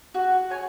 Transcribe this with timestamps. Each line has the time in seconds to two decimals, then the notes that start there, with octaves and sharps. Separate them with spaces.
0.14 F#4
0.50 C#5 G#5